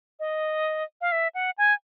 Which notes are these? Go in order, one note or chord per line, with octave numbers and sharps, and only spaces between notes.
D#5
F5
E5
F#5
G#5